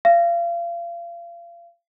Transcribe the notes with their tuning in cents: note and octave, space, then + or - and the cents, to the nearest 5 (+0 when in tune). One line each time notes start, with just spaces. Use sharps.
F5 -35